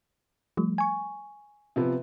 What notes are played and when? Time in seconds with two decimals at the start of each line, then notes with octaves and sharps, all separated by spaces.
0.57 F3 G3 A3
0.78 G#5 C#6
1.76 C3 F3 B3